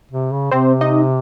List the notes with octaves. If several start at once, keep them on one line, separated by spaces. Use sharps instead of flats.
C3
C#3
C3 C4 C5
D#4 D#5